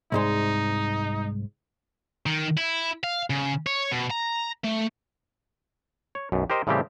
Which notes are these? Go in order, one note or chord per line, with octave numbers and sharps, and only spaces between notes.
C2 G#2 G#3 D#4
D#3
E4
F5
C#3
C#5
B2
A#5
A3
C#5
B1 F#2
G4 A#4 C5 D#5
A2 C#3 E3 G3 C4 G4